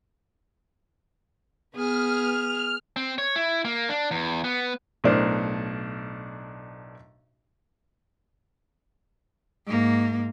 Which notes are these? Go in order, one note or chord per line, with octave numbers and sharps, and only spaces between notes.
B3 G#4 F6
C4
C#5
E4
A#3
D4
E2
B3
B1 A2 D4 A#4 C5
G#2 A#3